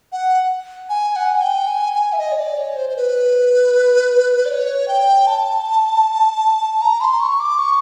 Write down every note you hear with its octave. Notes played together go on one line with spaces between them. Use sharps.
F#5
G#5
F#5
G#5
G5
G#5
G#5
E5
D#5
C#5
D5
C#5
C5
C5
B4
D5
C#5
G5
A5
A#5
C6
C#6
D6
C#6